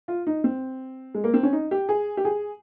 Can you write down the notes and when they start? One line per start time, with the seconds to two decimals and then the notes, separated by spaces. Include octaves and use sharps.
0.08 F4
0.27 D#4
0.44 C4
1.15 G#3
1.24 A#3
1.34 C4
1.43 C#4
1.53 D#4
1.71 G4
1.89 G#4
2.17 G4
2.25 G#4